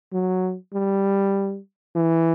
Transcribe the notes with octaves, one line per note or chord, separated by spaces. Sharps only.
F#3
G3
E3